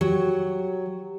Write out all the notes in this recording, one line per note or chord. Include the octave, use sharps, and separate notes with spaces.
F#3 G4